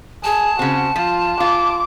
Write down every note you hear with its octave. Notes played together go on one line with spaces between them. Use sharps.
G#4 A5
C#3 C4 F#4
F3 F4
F4 D6